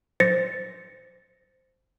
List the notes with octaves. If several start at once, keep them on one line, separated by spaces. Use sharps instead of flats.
C5 A6 A#6 C#7